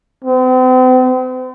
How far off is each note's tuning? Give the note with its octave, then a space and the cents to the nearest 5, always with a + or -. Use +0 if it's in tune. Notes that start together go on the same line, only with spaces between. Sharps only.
C4 -40